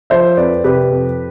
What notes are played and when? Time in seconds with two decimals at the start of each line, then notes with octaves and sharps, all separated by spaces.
0.10 F3 C5 E5
0.37 F2 B4 D5
0.64 C3 G4 B4
0.90 F2